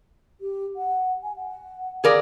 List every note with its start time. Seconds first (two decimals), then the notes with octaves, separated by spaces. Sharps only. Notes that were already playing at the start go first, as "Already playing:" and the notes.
0.41 G4
0.76 F#5
1.23 G#5
1.36 F#5
2.04 G#4 A#4 D5 F5